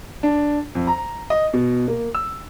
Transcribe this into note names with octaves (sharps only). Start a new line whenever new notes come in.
D4
F2
A#5
D#5
B2
A#3
E6